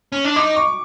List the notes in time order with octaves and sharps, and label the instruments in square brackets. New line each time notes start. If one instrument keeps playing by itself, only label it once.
[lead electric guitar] C#4
D4
[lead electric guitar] D#4 [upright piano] D6
[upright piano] C#6